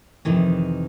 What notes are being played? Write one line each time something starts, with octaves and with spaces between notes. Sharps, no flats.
F2 C3 D#3 E3